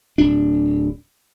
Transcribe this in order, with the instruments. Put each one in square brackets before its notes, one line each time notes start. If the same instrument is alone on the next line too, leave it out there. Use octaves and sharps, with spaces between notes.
[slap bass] D1 D4